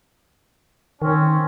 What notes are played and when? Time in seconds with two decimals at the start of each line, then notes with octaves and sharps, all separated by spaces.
1.02 D#3 C4 C#4